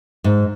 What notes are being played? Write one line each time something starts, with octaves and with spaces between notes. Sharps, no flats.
G#2